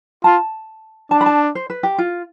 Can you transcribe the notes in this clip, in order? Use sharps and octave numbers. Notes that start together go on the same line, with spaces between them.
F4 A5
D4 A5
B5
A5
C5
B4
G4
F4